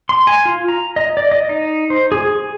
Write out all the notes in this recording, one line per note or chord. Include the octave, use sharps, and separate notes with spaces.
C6
G#5
F4
A#5
D#5
D5
D#5
D#4
C5
G#4
G#4